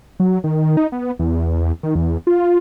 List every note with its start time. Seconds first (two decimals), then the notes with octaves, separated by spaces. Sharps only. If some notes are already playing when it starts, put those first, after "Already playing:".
0.20 F#3
0.44 D#3
0.77 D#4
0.92 B3
1.19 E2
1.83 D#3
1.95 E2
2.27 F4